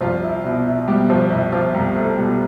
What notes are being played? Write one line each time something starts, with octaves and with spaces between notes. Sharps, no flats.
C2 F3 F4
E4
B2 E4
E4
B2 G3 G4
F3 F4
C2 E4
F3 F4
C2 G3 G4
A3 A4
B2 G3 G4